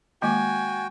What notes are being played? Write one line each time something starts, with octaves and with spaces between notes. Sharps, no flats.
D#3 G#3 A#3 F#4 G5 G#5